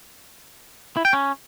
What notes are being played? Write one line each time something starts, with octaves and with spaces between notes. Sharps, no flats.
E4
G5
C#4